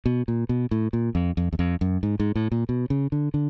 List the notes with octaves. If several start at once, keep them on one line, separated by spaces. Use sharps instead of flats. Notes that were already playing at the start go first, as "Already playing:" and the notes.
B2
A#2
B2
A2
A#2
F2
F2
E2
F2
F#2
G#2
G#2
A2
A#2
B2
C#3
D3
D3